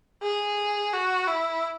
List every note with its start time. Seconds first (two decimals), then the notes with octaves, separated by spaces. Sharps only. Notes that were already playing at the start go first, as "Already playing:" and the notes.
0.23 G#4
0.93 F#4
1.28 E4